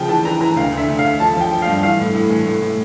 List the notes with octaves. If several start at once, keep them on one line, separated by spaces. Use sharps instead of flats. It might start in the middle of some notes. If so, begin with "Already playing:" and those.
Already playing: C#3 F3 G5
E3 A5
E3 A#5
E3 A#5
D2 F5
D2
E5
D2
D2 F5
F3 A5
F3
G5
F3
F5
G2
E3 F5
A2
A2
E3
A2
A2